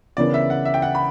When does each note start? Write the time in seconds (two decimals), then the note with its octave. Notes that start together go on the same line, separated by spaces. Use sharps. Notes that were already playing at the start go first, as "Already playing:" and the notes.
0.17 C#3 E3 B3 D4 A#4 D5
0.34 E5
0.50 F#5
0.65 E5
0.74 G5
0.82 F#5
0.95 B5